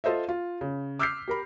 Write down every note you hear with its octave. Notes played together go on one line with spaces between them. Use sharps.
F4 A4 C5 D#5 E5
F4
C#3
D6 E6 F6 G6 B6 C7
G4 A#4 B5